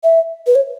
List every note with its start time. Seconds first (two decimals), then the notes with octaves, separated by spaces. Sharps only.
0.04 E5
0.47 B4
0.55 C#5